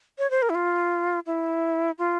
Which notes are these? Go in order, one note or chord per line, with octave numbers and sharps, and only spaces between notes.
C#5
C5
A#4
E4
F4
E4
F4